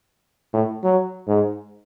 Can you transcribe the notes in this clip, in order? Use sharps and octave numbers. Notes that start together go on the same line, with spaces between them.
A2
F#3
G#2